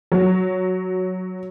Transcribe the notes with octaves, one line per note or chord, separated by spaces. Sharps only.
F#3